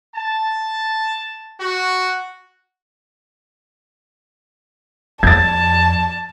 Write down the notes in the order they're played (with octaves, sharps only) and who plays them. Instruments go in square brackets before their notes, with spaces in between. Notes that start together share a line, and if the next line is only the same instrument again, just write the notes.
[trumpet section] A5
F#4
[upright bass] F2 [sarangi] A5 [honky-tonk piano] G#6 A6